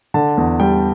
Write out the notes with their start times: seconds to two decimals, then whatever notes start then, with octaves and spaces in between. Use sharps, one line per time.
0.14 D3 A5
0.37 E2
0.60 G3 G5